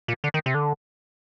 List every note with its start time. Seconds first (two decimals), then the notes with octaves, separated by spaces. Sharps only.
0.08 A#2
0.24 D3
0.34 D#3
0.46 C3
0.54 D3